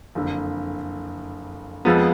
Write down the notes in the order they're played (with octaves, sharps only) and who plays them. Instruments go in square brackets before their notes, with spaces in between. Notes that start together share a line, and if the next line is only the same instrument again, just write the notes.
[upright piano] F#1 F2 D3
F2 F3 G#3 B3